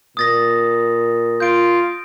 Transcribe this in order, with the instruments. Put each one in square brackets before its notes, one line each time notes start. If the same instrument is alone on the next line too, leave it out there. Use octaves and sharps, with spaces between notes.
[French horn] A#2 [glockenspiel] D#6 A6 A#6
[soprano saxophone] F4 [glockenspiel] G6 D7